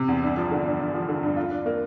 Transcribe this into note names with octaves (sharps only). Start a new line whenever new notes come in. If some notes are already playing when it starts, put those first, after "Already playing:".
Already playing: C3
E2
G2
F3
D3
G2
G2
F3
D3
G2
F4
D4
A#3